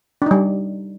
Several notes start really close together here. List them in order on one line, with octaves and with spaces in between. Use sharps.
D4 D#4 G3